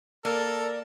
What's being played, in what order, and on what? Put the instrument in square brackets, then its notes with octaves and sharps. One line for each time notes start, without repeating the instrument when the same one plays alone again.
[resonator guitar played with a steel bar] A#3 [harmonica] A4 [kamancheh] A#4 [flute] D5